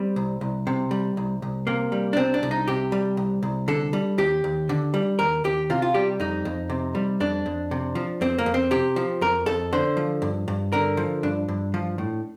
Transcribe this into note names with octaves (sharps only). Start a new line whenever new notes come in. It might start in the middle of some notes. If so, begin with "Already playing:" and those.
Already playing: G3 C4
C2
C2
C3
G3
C2
C2
C3 A#3
G3
D4
C2 C4
D4
C2
D#4
C3 G4
G3
C2
C2
D3 A4
G3
D#2 G4
D#2
D3
G3
D#2 A#4
D#2 G4
C3 F4
F4
G3 G4
F2 D#4
F2
C3
G3
F2 D4
F2
C3
F3
F2 C4
A#3
F2
C4
C3 G4
F3
F2 A#4
F2 A4
D3 C5
F3
G2
G2
D3 A#4
F3
G2 D4
G2
F3
A2